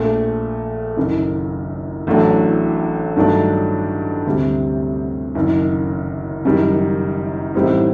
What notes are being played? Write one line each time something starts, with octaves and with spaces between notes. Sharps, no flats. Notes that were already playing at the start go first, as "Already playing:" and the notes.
Already playing: A#1 A#2 A3
F#1 F#2 D#3
A1 A2 F#3 A3 D4
G2 D#3 F#3 A3 D4
D2 C3 G3
F#1 F#2 D#3
F#1 F#2 D#3 G3
A1 A2 G3 C4 D#4